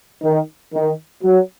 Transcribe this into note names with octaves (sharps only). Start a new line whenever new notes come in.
D#3
D#3
F#3